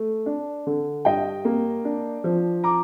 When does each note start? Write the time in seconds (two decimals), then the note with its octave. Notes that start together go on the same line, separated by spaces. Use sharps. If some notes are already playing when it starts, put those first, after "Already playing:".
Already playing: A3
0.26 D4
0.67 D3
1.05 G2 D#5 G5
1.45 A#3
1.85 D4
2.24 F3
2.64 A#5 D6